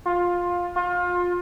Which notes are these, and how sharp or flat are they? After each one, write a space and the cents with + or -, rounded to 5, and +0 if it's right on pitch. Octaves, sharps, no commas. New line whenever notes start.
F4 +15
F4 +25